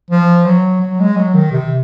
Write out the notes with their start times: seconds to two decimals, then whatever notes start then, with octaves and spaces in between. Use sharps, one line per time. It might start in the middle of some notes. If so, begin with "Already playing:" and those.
0.11 F3
0.46 F#3
0.81 F#3
1.00 G#3
1.17 F#3
1.34 D#3
1.52 C3